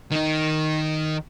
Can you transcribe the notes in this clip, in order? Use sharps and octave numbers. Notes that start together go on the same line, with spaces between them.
D#3 D#4